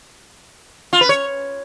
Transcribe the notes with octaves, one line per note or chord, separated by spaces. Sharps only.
F4
B4
C#5